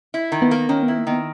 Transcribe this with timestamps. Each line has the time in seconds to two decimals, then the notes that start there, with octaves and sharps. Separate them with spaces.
0.14 E4
0.32 D#3
0.42 B3
0.51 A#3
0.69 D#3 C#4
0.83 B3
0.88 E4
0.98 A#3
1.07 D#3 B3